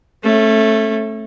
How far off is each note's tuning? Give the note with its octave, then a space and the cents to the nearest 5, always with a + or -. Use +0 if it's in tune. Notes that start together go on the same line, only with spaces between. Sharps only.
A3 +0 C#4 -35